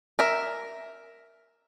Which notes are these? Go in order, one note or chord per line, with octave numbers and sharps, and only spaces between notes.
A#4 E5